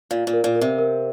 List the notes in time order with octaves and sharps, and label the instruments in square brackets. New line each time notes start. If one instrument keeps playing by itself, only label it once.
[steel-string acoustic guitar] A#2 [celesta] F5
[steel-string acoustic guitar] A#2
[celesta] A#4
[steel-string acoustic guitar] A#2
[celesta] A#4
[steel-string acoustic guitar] C3
[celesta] A#4